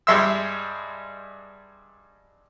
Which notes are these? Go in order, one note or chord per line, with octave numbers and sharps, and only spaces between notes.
G2 G3 G#3 E5 C6 E6